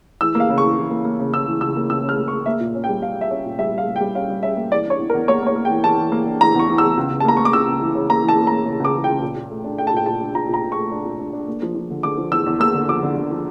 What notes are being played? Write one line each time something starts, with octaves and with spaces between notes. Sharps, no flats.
E3 E6
A#3
F5
C#3
C#6
E3
E3
A#3
A#3
C#3
C#3 E6
E3
C#2 E6
A#3
C#2 E6
C#3
F6
A#3
C#6
A#3
A#3 E5
A#2
C#4
G5
G3
G3 F5
G3
E5
C#4
A#2
G3 E5
G3 F5
A#3
G5
G3
C#4 F5
G3
C#4 E5
A#3
E3 D5
D4 C#5
E2
A#4
E2
A#3 C#5
A#3 C#5
A#3
G5
E3
E3 A5
E3
A#3
D4
E3 A#5
E2 C#6
E3
E2 E6
C#2
C#2
A5
A#3 A#5
A#3 C#6
D6
C#2 E6
C#2
E3
C#3
A#3 A#5
E3
A5
A#3
A#5
A#3
C#3
C#2 D6
E3
C#2 G5
A#2
A#2
A3
D4
A3 G5
A5
A#2 G5
A#2 A5
D4
A#2 A#5
A#2 A#5
A#2
C#6
A3
D4
A#2
D4
D4
A#3
F3
F3
D3
D3 D6
F3
E2 E6
E2
A#3 E6
D3
F3 D6
D3
D3
F3